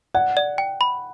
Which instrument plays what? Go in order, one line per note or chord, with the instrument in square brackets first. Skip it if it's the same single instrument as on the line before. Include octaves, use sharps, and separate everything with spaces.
[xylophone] D5 [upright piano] F#5
[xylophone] D5
G5
B5